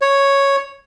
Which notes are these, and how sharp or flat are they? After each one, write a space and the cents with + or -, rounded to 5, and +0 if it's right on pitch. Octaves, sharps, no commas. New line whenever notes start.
C#5 +0